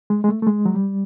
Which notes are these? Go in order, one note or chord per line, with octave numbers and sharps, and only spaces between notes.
G#3
G#3
A3
A3
G#3
F#3
G3